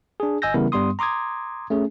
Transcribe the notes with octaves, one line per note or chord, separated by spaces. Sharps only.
D4 G#4
G1 D#5 G#5 E6 G6 A#6
C#3 E3 G3 B3 E4 A#4
G2 G3 B3 C6 D#6
A#5 C6 D6 D#6 G#6
A3 C#4 G#4